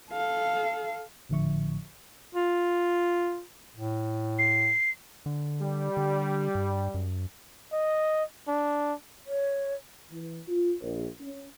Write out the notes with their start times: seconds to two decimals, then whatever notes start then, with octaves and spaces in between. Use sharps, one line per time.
0.11 A4 F5
1.29 G#1 A2 D3 F3 E5 C#6
2.35 F4
3.77 A2
4.39 C7
5.26 D3
5.61 G3
5.97 D3
6.55 G2
6.94 F#2
7.73 D#5
8.48 D4
9.27 C#5
10.11 E3
10.48 F4
10.81 A#1
11.21 C#4